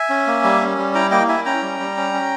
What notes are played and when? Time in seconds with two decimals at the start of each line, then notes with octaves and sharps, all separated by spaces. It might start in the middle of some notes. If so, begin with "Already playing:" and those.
Already playing: E5 G#5
0.09 C#4
0.27 A#3
0.44 G3
0.60 C#4
0.78 G3
0.95 E4 G5 A#5
1.11 A#3 D#5 G5
1.29 E4 E5 G#5
1.46 C#4 G5 A#5
1.63 G3
1.80 G3
1.97 C#4
2.13 C#4